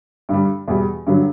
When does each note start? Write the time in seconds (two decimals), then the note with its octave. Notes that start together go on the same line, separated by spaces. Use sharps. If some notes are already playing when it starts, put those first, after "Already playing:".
0.29 G2 D3 G3
0.68 E2 B2 G3
1.07 G2 D3 F#3